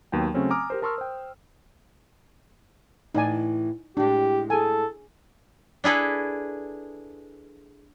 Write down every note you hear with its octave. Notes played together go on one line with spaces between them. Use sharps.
D#2 F#3 B3 G5
C#3 F#3 A3 C4 C#4
G#5 A#5 D6 D#6 F6
G4 A#4 C5
A#4 A5 C6 C#6 E6 F6
C5 G5
A2 E3 D#4 D5 G#5
A2 G#3 D4 G4
G#4 A4 G#5
D4 E4 G#4 A4 B4